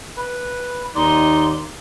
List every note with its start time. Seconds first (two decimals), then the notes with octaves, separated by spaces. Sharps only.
0.17 B4
0.95 D#2 D#4 D5 C6